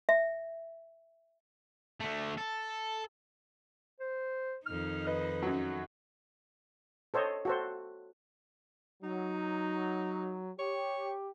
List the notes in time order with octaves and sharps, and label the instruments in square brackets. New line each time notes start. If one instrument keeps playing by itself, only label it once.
[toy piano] E5
[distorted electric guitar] D3 A3
A4
[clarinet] C5
[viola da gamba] F2 D#3 D#4 [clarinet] F6
[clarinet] B4 [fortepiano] D#5
[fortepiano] F#2 F#3
[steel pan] A4 C5 C#5 D#5
F#4 A4 C5
[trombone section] F#3 [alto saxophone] D#4
[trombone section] G4 [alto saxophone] C#5